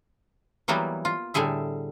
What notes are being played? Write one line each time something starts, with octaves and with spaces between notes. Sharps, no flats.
E3 F#3 G3 A#3 B3
F4
A2 D3 G3 G#4 E5